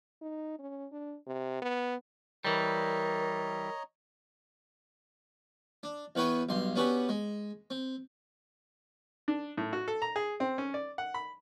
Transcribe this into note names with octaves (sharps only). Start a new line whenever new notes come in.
D#4
C#4
D4
C3
B3
E3 G3 A#4 C#5 D#5 A#5
D4
E2 B3 B4 C#5 G5 G#5
B1 G2 C6
B3 C#4 D4 F#4 G4 B4
G#3
C4
D4
A2
F#4
A4
A#5
G#4
C4
C#4
D5
F#5
B5